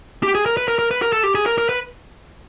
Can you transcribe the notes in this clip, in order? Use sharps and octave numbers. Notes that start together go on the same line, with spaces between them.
G4
G#4
A#4
B4
A#4
A#4
B4
A#4
A4
G4
G#4
A#4
A#4
B4